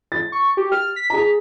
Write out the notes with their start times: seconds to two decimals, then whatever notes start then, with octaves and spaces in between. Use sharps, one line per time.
0.12 A6
0.32 C#6
0.57 G4
0.72 F6
0.96 B6
1.10 G#4 A#5